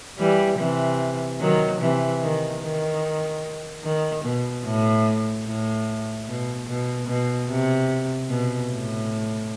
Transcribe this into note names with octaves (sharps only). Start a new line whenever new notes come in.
E3 G3
C3 E3
D#3 F#3
C3 E3
D#3
D#3
D#3
B2
A2
A2
B2
B2
B2
C3
B2
A2